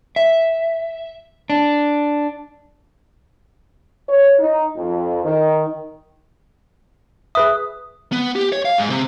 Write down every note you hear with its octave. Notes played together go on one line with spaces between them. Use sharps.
E5
D4
C#5
D#4
F2
D#3
G#4 B4 E5 D#6
B3
G4
C#5
F5
G#2
C3